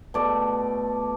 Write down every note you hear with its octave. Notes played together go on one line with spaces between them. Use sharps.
B2 A3 D5